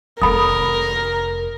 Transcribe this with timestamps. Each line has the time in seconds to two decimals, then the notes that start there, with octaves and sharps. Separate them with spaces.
0.22 F1 C3 A4 A#4 B5 D#6